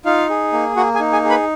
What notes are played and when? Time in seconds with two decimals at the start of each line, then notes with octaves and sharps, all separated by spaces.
0.05 D#4 F4 F5
0.29 G#4
0.53 A#3
0.76 A#3 F#4 F#5
0.94 G#4 G#5
1.00 D#4
1.12 G#4 G#5
1.24 G#4
1.30 B4 B5